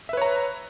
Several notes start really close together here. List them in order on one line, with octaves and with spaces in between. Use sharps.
E5 B4 C#5 A#5